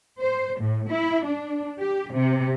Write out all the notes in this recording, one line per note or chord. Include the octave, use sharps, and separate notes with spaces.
C5
A2
E4
D4
G4
C3